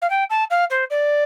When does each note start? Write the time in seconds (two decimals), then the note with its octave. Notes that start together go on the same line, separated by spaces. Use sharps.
0.02 F5
0.10 G5
0.30 A5
0.50 F5
0.70 C5
0.90 D5